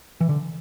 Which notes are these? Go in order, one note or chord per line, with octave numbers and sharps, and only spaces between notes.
E3
D3